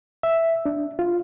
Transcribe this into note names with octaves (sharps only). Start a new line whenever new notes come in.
E5
D4
F4